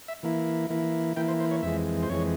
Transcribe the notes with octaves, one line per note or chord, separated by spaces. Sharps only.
E5
E3 A#3 E4
E3 A#3 E4
E3 A#3 E4 G5
C5
C5
C#5
F2 E3 G#3 E5
C5
F2 E3 G#3 C#5